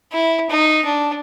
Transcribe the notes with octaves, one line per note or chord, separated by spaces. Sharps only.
E4
D#4
D4